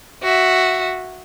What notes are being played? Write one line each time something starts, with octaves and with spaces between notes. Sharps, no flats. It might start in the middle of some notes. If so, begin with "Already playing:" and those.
F#4 E5